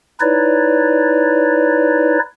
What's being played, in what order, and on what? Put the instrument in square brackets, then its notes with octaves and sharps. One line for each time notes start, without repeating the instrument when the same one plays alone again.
[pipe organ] D#4 E4 B4 C#5 D5